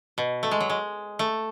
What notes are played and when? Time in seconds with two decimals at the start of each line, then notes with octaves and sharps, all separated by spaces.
0.18 B2
0.43 A3
0.51 G#3
0.60 F#3
0.70 G#3
1.19 A3